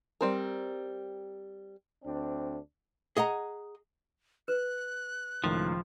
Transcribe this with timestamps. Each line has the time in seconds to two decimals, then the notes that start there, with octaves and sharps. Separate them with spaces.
0.21 G3 C4 A#4
2.04 D2 C4 D4
3.17 G#4 D#5 F#5 A#5
4.48 B4 F#6
5.44 C#2 A2 D#3 F3